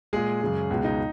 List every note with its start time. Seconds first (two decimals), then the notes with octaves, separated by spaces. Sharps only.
0.13 A#2 G#3 G#4
0.41 F#2 C#3 G#3
0.70 C#2 B2 G#3
0.84 D#4